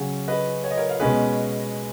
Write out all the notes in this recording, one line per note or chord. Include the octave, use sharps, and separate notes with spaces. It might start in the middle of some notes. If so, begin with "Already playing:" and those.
Already playing: C#3 F#3 C#4 G#4 C#5 F5
B4 D#5
C#5
D#5
A#4 C#5
F5
B2 G#3 C#4 G#4 B4 D#5